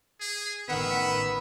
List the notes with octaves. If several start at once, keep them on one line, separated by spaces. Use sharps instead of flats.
G#4
A1 D#3 B3 E5 F#5
B5